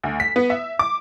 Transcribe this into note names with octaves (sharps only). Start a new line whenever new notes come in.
D2
B6
B3
E5
D6